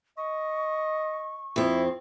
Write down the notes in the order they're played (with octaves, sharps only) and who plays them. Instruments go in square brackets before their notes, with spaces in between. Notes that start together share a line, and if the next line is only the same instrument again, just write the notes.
[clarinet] D#5 [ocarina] C#6
[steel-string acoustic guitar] F2 C4 [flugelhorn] E4